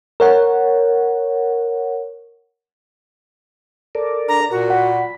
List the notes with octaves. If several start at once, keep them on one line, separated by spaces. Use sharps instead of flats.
A#4 C#5 F#5
A4 A#4 D5
D4 A#5
A#2 F#4 A#4
F#5 B5